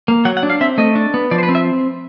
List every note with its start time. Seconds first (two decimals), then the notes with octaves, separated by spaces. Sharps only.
0.08 A#3
0.25 F#3 F#5
0.37 F#5
0.43 D4
0.50 F5
0.61 C4 E5
0.78 A3 D#5
0.95 D4
1.14 B3
1.31 F3 D5
1.38 C5
1.43 B4
1.49 C4
1.55 E5